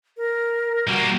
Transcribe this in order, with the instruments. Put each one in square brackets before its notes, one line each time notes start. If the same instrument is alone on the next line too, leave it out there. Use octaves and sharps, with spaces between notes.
[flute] A#4
[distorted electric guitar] G3 A#3 [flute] F#4